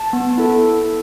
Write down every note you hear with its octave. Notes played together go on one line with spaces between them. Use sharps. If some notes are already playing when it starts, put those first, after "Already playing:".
Already playing: A5
B3
E4 A4